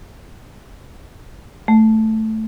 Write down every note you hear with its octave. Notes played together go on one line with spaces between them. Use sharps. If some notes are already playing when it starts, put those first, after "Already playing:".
A3